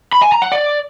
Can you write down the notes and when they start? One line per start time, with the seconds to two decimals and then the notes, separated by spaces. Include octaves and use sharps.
0.13 B5
0.22 G#5
0.32 A#5
0.42 F#5
0.52 D5